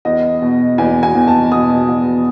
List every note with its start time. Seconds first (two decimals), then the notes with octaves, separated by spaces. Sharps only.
0.05 E2 D#5
0.42 B2
0.78 E2 G#5
1.03 G#5
1.15 E2
1.28 A5
1.52 B2 D#6
1.88 E2